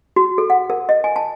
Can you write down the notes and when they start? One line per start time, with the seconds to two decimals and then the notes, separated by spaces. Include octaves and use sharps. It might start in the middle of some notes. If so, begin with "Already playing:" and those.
0.16 F#4
0.38 A4
0.50 F#5
0.70 A#4
0.89 D#5
1.04 G#5
1.16 A5